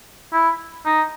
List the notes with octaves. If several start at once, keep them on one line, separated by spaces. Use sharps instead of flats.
E4
D#4